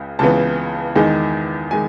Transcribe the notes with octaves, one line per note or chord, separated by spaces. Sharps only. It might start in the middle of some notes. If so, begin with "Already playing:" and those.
Already playing: C#2 C#3
C#2 C#3 E3 B3 A5
E2 D#3 G#3 D#4
D#3 G#3 G#5